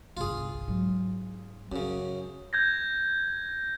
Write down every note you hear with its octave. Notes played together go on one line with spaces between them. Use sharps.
G1 C2 F4 G#4
G#2 F#3
F#2 C#3 C#4
G6 G#6 A#6